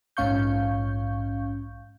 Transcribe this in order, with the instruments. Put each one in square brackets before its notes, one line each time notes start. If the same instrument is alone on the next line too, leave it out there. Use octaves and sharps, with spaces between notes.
[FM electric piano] A#1 G#2 C#4 F5 C#6 G6